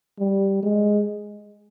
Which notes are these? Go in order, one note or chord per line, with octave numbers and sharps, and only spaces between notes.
G3
G#3